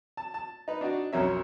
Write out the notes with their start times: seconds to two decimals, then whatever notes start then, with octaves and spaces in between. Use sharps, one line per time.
0.17 A5
0.34 A5
0.68 D#4 B4
0.81 D4 D#4 F#4 D5
1.13 B1 F2 F#3 C#4 A#4 E5